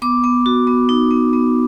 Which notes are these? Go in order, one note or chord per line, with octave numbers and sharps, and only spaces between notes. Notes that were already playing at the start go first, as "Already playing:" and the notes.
B3 D6
B3
F#4
B3
D#4
B3
B3